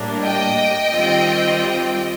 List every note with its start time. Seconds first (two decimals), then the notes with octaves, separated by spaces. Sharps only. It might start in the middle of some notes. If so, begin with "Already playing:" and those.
Already playing: A2 G3 A#3 D4
0.24 D#5 G5
0.91 D#3 G3 C4 F4